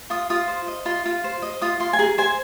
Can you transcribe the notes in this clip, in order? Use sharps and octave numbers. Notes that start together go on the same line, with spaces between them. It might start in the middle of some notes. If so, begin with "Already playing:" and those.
F4 D#6
F4 D#6
C5
D#5
F4 C6
F4
C5
D#5
F4 D#6
F4 C6
G#5
G#4 A#5
C5 G#5